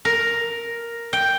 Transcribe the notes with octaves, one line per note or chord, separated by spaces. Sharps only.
A#4
G5